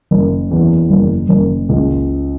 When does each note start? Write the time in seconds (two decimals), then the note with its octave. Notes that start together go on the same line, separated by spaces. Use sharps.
0.11 F#1
0.51 E2
0.90 F#1
1.29 F#1
1.69 C#2